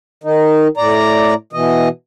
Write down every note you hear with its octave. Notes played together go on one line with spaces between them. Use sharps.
D#3 D#4
A2 D5 A#5
B2 E3 D#5